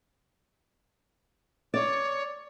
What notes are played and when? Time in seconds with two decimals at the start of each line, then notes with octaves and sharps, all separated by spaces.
1.74 C#5 D5